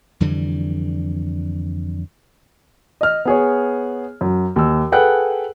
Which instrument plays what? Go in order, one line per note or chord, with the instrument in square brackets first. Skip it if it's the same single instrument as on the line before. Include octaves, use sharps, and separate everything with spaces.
[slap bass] F2 D3 E3 G3
[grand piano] D#5 F6
B3 G#4 C#5
F#2
D#2 E6
G#4 A4 B4 F#5 G5 F#6